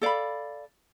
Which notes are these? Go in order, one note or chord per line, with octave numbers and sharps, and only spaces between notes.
A4 D5 F5 B5